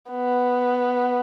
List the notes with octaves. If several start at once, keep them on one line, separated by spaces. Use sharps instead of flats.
B3